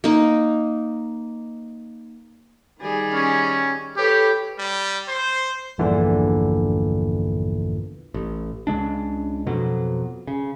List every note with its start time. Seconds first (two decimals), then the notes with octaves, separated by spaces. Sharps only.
0.04 A#3 D#4
2.80 D#3 G3 G#4
3.14 C#4
3.97 G4 A4 B4 C#5
4.58 G3
5.08 C5
5.78 A#1 E2 G2 A#2 D3 E3
8.14 A1
8.67 C#2 C#3 G#3 D4
9.46 F2 B2 F#3
10.27 C#3